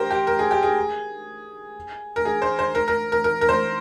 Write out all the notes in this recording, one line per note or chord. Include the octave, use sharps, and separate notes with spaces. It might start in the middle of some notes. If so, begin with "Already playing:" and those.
Already playing: G4 A#4 C5
G4
A#4
G#4
G4
G#4
A#4
G#4
C5
C5
A#4
A#4
A#4
A#4
A#4
C5